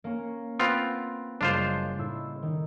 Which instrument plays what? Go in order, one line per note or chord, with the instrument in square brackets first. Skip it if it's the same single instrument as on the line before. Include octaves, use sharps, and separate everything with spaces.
[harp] A#3 C#4
[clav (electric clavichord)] B3 C4 F4 [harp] D7
[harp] F#1 G3 G#3 [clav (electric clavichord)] D4 F4 C5
[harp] G6
A2 E4 E6
D#3